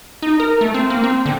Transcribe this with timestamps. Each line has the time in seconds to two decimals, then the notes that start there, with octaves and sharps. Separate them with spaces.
0.22 D#4
0.40 A#4
0.61 A3
0.74 C4
0.90 A#3
1.04 C4
1.26 D3